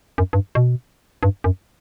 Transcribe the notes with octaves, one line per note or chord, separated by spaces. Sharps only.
F#2
G2
B2
G2
F#2